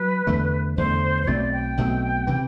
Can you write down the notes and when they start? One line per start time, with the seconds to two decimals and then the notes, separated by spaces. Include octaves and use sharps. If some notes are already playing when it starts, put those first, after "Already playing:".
Already playing: F#3 B4
0.27 E2 D3 A3
0.77 E2 D3 A3 C5
1.23 C5
1.27 B1 B2 A3 C4 D5
1.52 G5
1.77 B1 B2 A3 C4
2.27 C3 E3